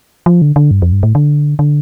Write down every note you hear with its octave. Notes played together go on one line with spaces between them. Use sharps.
F3
D3
D3
G2
F2
G2
A2
D3
D3